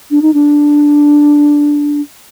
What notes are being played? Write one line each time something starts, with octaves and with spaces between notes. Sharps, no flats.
D4
D#4
D4